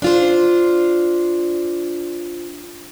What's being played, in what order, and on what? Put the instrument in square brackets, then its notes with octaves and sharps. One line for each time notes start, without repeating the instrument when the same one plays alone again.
[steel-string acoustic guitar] D4 F4 C5